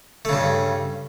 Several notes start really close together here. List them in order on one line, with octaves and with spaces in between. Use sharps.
A3 C#3 G2